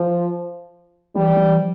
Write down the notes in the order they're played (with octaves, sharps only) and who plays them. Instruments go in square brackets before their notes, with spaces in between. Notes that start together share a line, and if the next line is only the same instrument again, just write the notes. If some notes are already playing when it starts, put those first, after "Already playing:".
Already playing: [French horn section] F3
[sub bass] E3 [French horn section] G3
[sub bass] E3
F3